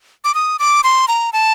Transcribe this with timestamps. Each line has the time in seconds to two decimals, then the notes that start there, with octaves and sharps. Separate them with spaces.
0.24 D6
0.34 D#6
0.59 D6
0.84 C6
1.08 A#5
1.33 A5